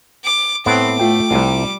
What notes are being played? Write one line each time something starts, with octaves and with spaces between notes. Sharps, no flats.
D6
A2 B3 C4 D6
A3 F4 G5
C2 C3 G3